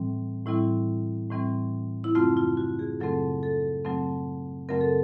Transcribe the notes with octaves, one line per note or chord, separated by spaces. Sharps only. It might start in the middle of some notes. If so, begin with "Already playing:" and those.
Already playing: A2 E3 G3 C4
A2 E3 G3 C4 E4
A2 E3 G3 C4
E4
F#2 C#3 F#3 A3 C4 F4
F4
F#4
G#4
F#2 C#3 F#3 A3 C4 A4
A4
F#2 C#3 F#3 A3 C4
F#2 C#3 F#3 A3 C4 A#4
A4